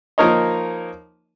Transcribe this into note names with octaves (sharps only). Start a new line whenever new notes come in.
F3 A#3 D#4 A#4 C#5 D#5